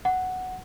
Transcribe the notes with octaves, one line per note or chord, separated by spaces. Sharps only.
F#5